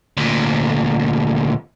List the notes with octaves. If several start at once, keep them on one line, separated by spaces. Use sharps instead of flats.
D2 A#2